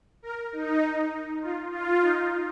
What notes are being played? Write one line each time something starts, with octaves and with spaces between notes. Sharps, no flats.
A#4
D#4
F4
F4
D#4